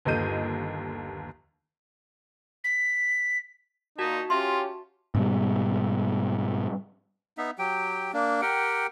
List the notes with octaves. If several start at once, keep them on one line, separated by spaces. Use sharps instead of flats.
G1 D#2 A4 D#5 G6 D#7
B6
A#2 D#4 F#4 A5
C#4 F4 G4 E5 C6
G#2 B2 G3
B3 D#4 E5
F#3 G4 G5
A#3 D4
G4 A#4 F#5 G5